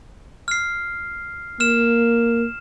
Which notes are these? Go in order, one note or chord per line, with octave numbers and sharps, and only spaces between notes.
F6 C7
A#3 F6 E7